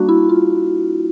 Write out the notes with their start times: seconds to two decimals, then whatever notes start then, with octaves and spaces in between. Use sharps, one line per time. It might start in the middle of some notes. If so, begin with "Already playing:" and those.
Already playing: G3 A#3 D4 F#4
0.09 E4
0.29 F4